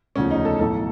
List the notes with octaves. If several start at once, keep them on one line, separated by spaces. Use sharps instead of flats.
E1 D2 C#3 F3 C#4
D#4
A4
B1 A2 E3 A4